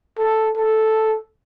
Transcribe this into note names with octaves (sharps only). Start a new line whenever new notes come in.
A4
A4